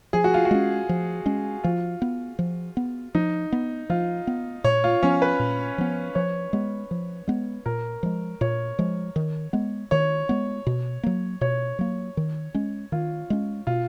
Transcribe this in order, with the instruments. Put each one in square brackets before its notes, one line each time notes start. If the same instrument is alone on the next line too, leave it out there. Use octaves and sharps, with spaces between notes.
[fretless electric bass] F3 [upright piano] G#4
[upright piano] F#4
F4
F#4
[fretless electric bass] G#3 C#4
F3
G#3 C#4
[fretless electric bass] F3 [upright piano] F4
[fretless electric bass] B3
F3
B3
[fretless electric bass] F3 [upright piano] D#4
[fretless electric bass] B3
[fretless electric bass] F3 [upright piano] F4
[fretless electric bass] B3
[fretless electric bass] A#2 [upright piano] C#5
[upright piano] F4
[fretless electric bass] F3 B3 [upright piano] C#4
[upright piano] B4
[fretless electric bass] A#2
F3 B3
[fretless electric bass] F3 [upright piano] C#5
[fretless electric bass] G#3 B3
F3
G#3 B3
[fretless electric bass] A#2 [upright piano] A#4
[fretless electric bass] F3 G#3
[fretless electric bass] A#2 [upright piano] C#5
[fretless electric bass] F3 G#3
D#3
G#3 B3
[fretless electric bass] D#3 [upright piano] C#5
[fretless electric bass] G#3 B3
B2
F#3 A#3
[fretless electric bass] B2 [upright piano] C#5
[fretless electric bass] F#3 A#3
D#3
G#3 C#4
[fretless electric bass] D#3 [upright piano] F4
[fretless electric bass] G#3 C#4
[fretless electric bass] B2 [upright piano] F4